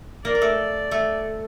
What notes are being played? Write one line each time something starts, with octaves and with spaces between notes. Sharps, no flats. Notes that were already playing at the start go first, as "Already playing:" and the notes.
A#3 A#4 D5
A#4
A3 A4
A3 A4